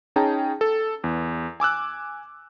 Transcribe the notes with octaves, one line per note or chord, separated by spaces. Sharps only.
C#4 D#4 G#4 G5 A5 A#5
A4
E2
G#5 D6 E6 F#6